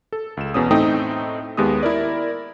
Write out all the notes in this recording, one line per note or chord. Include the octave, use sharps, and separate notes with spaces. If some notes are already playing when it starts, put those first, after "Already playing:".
A4
C#2 E7
E2 B2 C#4 D#6
A2 A3 C4 D#4 G5 D#6
D#2 G#3 B3 G4 D#6
E4 A#4 D5